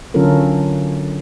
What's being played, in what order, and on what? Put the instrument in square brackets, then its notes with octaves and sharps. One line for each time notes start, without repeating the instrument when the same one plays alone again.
[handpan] D3 F#3 C#4 F4 A4 A#4